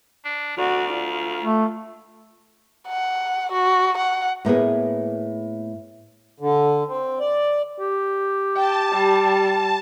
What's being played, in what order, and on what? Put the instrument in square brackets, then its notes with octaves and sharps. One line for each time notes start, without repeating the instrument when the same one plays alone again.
[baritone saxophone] D4
[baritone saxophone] D2 [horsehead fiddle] F#4 D5
[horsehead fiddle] F4
[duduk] A3
[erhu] F#5
F#4
F#5
[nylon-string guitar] A2 A#3 B3 G#4
[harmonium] D3
C4
D5
[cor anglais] G4
[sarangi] G5 [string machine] A5
[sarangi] G3